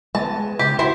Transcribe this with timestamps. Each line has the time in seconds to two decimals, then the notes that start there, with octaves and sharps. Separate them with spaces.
0.15 G#3 B3 A5
0.59 C#3 G4
0.79 E4 F#4 C5 G5